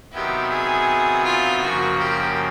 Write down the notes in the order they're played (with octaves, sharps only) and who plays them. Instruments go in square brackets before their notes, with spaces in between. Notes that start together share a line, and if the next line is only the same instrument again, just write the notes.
[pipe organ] C3 D#3 F#3 B3 E4 [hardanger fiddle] G4
[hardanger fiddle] G#4
F4
[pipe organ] F#2 C#3 F3 A#3 [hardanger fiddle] F#4
[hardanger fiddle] G4